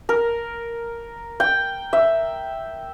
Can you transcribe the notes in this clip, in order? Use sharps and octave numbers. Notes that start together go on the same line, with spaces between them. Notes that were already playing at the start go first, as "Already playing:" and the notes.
A#4
G5
E5